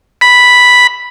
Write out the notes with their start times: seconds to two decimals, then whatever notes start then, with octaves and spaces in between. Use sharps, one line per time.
0.21 B5